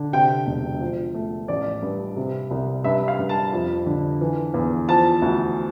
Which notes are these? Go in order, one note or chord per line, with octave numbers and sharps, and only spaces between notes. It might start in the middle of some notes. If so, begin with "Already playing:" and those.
Already playing: D3
C3 G5
E1
F3
A3
A1 D5
G2
C3
C2
G2 E5
F5
G2
A5
F2
D3
E3
E2
F3 A5
D2